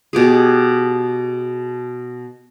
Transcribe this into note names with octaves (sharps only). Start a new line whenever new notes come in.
B2 G4 G#4